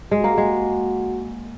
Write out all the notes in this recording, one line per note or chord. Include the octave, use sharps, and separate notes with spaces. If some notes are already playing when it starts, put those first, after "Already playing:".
G#3 F#4
A#3
G#3